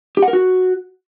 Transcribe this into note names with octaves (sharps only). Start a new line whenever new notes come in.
G4
F#5
A#4
F#4